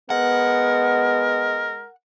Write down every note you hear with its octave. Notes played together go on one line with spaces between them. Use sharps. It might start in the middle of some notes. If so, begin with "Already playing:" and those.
G#3 B3 A#4 F#5